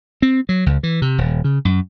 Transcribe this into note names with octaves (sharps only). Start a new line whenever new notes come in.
C4
F#3
C#2
E3
C3
D#1
C#3
F#2